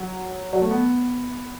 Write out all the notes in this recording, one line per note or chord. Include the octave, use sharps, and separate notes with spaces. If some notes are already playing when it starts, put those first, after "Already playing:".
Already playing: F#3
F#3
A3
B3